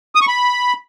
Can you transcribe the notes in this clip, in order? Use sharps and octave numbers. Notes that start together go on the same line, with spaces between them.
D#6
C#6
B5